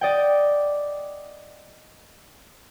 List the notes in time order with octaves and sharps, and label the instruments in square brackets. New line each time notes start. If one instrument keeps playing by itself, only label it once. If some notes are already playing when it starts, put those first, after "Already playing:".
[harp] D5 D#5 F#5 G5